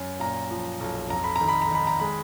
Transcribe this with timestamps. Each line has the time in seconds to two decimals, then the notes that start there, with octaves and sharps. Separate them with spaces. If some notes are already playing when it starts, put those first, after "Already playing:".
Already playing: F#2
0.20 A#2 A#5
0.51 F3
0.80 B1
1.10 F2 A#5
1.24 B5
1.36 A#5
1.41 D#3
1.48 B5
1.62 A#5
1.71 D#3 B5
1.87 A#5
2.00 G#3 B5